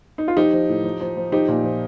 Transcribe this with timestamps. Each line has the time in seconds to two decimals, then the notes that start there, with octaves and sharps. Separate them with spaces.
0.18 D#4
0.28 F4
0.36 F3 D#4 G4
0.53 F3
0.69 A2
0.84 F3
1.01 F3
1.17 F3
1.32 F3 D#4 G4
1.48 A#2
1.64 F3